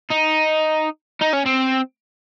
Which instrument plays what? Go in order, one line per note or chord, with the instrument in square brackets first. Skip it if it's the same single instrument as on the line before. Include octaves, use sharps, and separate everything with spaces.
[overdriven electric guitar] D#4
D#4
C#4
C4